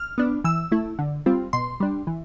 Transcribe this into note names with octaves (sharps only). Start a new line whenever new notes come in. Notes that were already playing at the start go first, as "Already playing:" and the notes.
Already playing: F6
B3 D4
E3 E6
A3 E4
D3
G3 C4 F4
B2 C6
G3 D4
E3